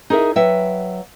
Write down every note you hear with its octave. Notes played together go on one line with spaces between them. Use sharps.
D#4 G#4 A#4 E5
F#3 B4 E5 F#5 G5